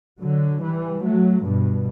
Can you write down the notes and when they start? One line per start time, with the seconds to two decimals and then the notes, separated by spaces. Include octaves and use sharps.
0.21 D3 F#3
0.62 E3 G3
1.02 F#3 A3
1.43 G2 B2